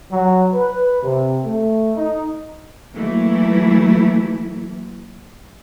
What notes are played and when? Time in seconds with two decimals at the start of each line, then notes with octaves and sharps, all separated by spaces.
0.12 F#3
0.53 B4
1.02 C3
1.45 A3
1.95 D#4
2.94 E3 F#3 A3 A#3 E4